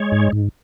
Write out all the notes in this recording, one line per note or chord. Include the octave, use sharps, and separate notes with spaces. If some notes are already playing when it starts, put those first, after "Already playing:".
Already playing: G#3 C#5
G#2
G#2